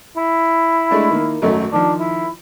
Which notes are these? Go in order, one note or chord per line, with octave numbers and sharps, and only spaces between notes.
E4
G#3 A3 D4
D#3 A#3
G#1 F#2 A3
D#3 F3 D4
E4